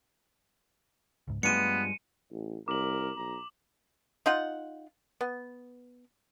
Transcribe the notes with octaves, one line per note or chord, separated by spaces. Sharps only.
C#2 G#2
G2 F3 G#3 A3 B3 C#7 D#7
A1
C2 A#4 D6 F#7
B1 A#5
D#4 F4 F#5
B3